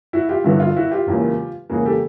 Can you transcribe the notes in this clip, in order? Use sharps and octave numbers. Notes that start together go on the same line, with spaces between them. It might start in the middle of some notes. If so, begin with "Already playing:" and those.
E4 F#4
F4 G4
G2 D3 F#3 B3 E4 F#4
F4
E4 F#4
F4 G4
E1 E2 C#3 F#3 A#3
E1 E2 C#3 F#3 A#3 F#4 G#4
G4 A4